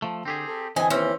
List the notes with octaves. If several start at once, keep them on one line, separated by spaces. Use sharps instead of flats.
F3 A3
D3 C4 G4 G#4
A4
D3 E3 C4 D#5 G#5
D#2 E3 C4 C#4